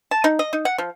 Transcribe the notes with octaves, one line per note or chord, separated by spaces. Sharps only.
A5
D#4
D#5
D#4
F#5
F3